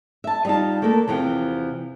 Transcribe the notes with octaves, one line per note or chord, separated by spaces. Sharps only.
E5 A5
G3 B3 D#4 F4 A5
A3 A#3 D4 A4 A#4
E2 C3 E3 F3 G5